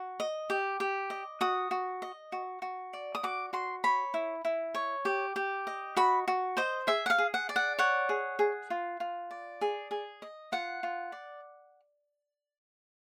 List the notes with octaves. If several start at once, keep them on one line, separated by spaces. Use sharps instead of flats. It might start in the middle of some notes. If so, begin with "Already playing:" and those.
Already playing: F#4
D#5
G4
G4
D#5
F#4 D#6
F#4
D#5
F#4
F#4
D5
D#6
F#4 D6
F#4 C6
C#5 B5
E4
E4
C#5
G4
G4
D#5
F#4 B5
F#4
C5 D#5
G#4 E5
F#5
F5
G#4
F#5
D5
F#5
C#5 F#5
G#4
G#4
F4
F4
D5
G#4
G#4
D#5
F4 F#5
F4
D5